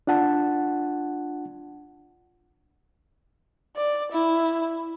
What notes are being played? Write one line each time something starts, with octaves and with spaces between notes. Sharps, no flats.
D4 F4 F#5 A5
D5
E4